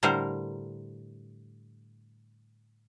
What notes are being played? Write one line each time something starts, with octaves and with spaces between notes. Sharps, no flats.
A2 D3 G3 A#4 C5 A#5